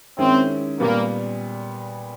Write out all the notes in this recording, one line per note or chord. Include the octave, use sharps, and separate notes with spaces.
D#3 G#3 C4 C#4 E4
A#2 G3 A#3 B3